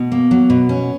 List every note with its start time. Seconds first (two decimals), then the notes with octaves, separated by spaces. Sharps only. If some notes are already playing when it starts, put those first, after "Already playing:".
Already playing: B2
0.12 A#3
0.31 F#3
0.50 B2
0.69 C#4